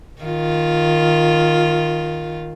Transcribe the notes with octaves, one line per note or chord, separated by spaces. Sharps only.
D#3 F4